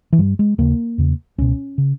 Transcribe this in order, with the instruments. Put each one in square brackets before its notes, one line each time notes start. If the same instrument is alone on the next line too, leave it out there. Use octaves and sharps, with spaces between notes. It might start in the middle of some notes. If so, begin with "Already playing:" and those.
[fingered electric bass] E3
G2 G3
G#3
D#2 C#3 A#3
E2 C#3
C#2 B2 C#4
C#3